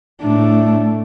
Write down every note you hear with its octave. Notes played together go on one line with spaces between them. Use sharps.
A2 A3 D4